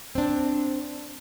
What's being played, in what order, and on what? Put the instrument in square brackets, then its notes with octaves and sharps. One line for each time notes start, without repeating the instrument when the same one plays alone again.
[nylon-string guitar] C4 D4